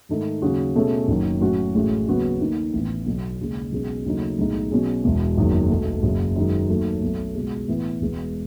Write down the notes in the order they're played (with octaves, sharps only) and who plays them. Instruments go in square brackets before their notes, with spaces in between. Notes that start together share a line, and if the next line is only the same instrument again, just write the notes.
[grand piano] G#2 D#3 A3 D#4
D#2 C#3 F#3 C#4 F#4
B2 A3 C#4 G#4
F#1 F#2 D#3 F#3
A2 F#3 C#4 F#4
A1 A2 G#3 C#4 F#4
D#2 C#3 F#3 B3 F#4
D#2 D#3 A3 D#4
A1 A2 E3 B3
B1 B2 F#3
D#2 C#3 G#3
B1 B2 G#3 C#4
D#2 C#3 F#3 A3 D#4
B1 A2 G#3 D#4
B2 F#3 C#4 G#4
E1 E2 B2
F#1 E2 D#3 F#3
B1 B2 A3
F#1 F#2 C#3
F#2 D#3 G#3
D#2 D#3 F#3 A3
B1 B2 F#3 A3
C#2 B2 G#3
A2 E3 B3 E4
E1 E2 B2 G#3 B3